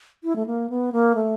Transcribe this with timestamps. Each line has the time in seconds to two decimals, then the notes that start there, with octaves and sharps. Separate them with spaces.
0.24 E4
0.36 A3
0.46 A#3
0.70 B3
0.92 A#3
1.15 A3